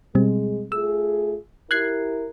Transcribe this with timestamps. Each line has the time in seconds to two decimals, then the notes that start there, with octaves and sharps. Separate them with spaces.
0.15 B2 G3 G#3 C4
0.72 A3 F4 G#4 E6
1.71 E4 G4 A#4 F#6 G#6 C7